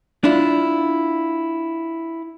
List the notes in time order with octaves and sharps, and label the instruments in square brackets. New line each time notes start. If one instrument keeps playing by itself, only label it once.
[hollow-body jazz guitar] D4 E4 F4